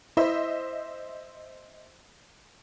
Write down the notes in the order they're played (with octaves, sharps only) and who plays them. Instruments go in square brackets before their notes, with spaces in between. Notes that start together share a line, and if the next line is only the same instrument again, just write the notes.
[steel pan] E4 [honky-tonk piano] C5 D#5 E5